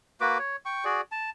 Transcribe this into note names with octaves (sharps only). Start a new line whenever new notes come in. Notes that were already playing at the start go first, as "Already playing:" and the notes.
A#3 F#4 B4 D6
C#5
G5 C#6
F#4 G#4 D5
A5